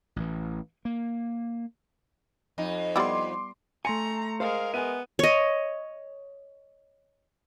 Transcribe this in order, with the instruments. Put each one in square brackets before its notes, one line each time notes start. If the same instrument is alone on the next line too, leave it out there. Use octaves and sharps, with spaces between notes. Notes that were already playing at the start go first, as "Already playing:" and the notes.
[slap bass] A1 E3
A#3
[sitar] F2 D#4
[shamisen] G3 B3 E4 [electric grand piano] C6 D6
[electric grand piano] A3 C6 C#7 [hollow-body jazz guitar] G#5 [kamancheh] A#5
[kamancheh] G#3 A#4 [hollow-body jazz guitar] C5 [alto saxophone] F5
[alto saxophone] B3 [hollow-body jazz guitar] E5 G#5 [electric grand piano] D#7
[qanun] C#5 D#5